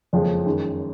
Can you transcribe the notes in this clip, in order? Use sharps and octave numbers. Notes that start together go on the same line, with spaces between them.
F#1 F2 F3 G#3 C#4
F#2 D#3 G#3